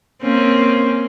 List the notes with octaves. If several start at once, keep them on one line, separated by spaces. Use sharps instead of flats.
A#3 C4 C#4